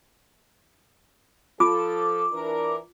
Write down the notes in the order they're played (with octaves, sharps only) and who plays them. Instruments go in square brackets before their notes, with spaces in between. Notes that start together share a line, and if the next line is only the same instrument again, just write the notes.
[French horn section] F3 A4 [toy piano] F4 [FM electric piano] D6
[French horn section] E3 D4 A#4